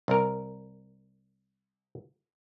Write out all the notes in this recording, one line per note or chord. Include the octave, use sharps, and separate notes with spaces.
C2 A#4